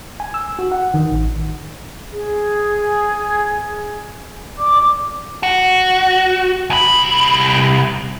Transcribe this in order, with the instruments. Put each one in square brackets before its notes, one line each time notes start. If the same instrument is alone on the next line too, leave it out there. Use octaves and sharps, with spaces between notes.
[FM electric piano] G#5
E6
F#4
F#5
D#3
A1
[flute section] G#4
D5 D6
[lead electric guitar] F#4
C2 B5